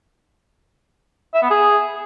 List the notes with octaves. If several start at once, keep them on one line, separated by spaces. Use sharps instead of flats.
E5
B3
G#4